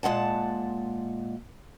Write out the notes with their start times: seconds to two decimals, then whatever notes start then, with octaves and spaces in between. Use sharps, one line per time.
0.03 A#2 G#3 F#5 A5